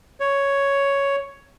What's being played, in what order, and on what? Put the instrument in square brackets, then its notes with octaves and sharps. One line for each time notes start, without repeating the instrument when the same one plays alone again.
[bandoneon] C#5